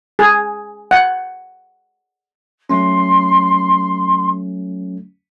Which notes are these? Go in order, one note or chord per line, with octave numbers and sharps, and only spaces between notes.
G#4
F#5
F#3 A3 C#4 C6